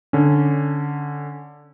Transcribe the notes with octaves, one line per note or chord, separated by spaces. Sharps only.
D3 C#4